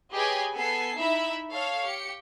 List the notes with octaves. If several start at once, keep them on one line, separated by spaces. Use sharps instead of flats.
G4 G#4 B4 C#5 D#5 G#5
B3 A4 G#5 C7
D#4 E4 E5 B5
A4 C#5 F5
G4 C#7